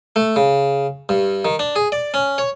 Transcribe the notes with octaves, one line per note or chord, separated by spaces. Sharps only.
A3
C#3
G2
D#3
D4
G#4
D5
C#4
C#5